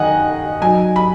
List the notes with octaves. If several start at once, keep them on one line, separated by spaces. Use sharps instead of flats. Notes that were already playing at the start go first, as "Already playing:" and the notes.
Already playing: D#3 D#4 D#5 F#5 G#5
F#3 D#4 G#5
B5